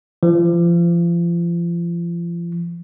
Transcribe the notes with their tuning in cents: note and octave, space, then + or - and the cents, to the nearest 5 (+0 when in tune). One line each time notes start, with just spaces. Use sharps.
F3 -35